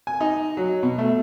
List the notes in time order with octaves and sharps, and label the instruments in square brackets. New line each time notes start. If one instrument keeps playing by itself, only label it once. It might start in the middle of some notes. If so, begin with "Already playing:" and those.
[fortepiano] G#5
D#4
F#3
B2
A3